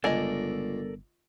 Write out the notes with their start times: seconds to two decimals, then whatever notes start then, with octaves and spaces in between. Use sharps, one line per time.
0.04 G1 C#2 A4 A#4 D5 D#5 G#5